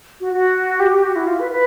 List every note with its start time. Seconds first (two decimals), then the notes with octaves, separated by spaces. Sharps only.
0.21 F#4
0.33 F#4
0.80 G4
0.91 G4
1.04 F#4
1.16 E4
1.27 F4
1.39 B4
1.51 B4